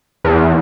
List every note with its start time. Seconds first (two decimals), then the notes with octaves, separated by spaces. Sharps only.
0.24 E2